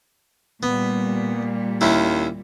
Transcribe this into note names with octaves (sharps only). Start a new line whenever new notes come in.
A#2 G3 B3
D#2 C#4 E4